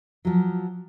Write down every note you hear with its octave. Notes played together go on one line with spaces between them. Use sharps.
F3 F#3